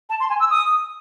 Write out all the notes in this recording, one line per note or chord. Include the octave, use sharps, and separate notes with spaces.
A5
C6
G#5
E6
D#6